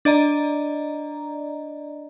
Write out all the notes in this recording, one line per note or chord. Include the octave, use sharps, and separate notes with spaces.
D4 D5 D#5 A#5